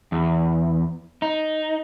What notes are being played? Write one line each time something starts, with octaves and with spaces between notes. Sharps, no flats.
E2
D#4